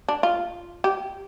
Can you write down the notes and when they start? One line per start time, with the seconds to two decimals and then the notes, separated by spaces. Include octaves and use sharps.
0.08 D4
0.23 F4
0.84 G4